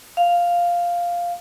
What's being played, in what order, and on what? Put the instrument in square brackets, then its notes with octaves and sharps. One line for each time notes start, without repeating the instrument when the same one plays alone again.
[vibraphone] F5